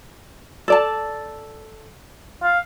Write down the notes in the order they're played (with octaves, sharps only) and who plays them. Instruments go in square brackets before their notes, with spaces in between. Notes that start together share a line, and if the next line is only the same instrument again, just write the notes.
[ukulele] A4 D5 A5
[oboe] F5